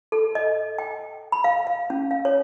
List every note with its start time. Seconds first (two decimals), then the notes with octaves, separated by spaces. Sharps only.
0.12 A4
0.35 D#5
0.79 G5
1.32 B5
1.44 F5
1.67 F5
1.90 C#4
2.11 F5
2.25 C#5